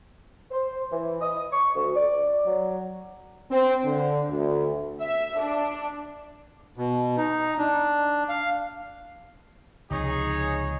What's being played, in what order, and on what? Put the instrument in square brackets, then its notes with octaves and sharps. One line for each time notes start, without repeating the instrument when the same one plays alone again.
[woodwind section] C5
E3
D#6
C#6
D2
D5
F#3
[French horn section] C4
D3
D2
[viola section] E5
D4
[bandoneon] B2
D#4
D4
F5
[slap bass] C#2 C3 F3 [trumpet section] D#4 G#4 C#5